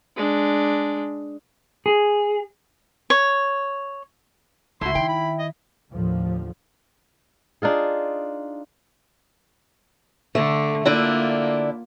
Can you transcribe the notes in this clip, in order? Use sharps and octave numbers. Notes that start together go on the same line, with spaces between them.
G#3 D4
G#4
C#5
C#2 A3 E4 F#4 C6
D#3 G5
B5
D#5
D#2 A2 D3 F3
D4 D#4 F4 G#4
D3 A3
D3 A#3 D4 E4 F4